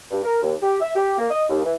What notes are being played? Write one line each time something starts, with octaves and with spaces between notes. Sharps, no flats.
G2
A#4
D#2
G4
E5
G4
A#3
D#5
D#2
E3